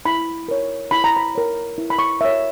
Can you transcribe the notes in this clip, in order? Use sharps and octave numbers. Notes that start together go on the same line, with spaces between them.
E4 B5
A#4 C#5
E4 B5
A#5
B5
A#4 C#5
E4
B5
C#6
A#4 C#5 E5